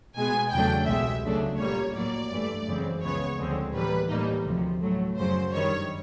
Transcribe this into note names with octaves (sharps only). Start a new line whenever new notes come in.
B2 G#3 B3 G#5
E2 C#3 F#3 A3 D4 G5
C2 B2 G#3 E5
D2 C#3 F#3 A3 D4
A#2 G3 A#3 C#5
A2 F#3 A#3 D5
G2 E3 A3
F#2 C#3 E3 G#3 C4
C#2 C#3 F3 G#3 B3 C#5
D2 D3 F3 G#3 C4
A2 E3 G3 A#3 B4
A2 E3 G3 A#3 D#4
D2 C3 F3
A2 F#3 A3
F#2 C#3 F#3 C5
G2 D#3 G3 C#5